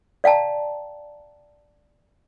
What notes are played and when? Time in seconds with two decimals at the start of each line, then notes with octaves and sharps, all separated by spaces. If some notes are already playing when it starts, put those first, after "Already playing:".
0.24 D5 F5 G5 A5 A#5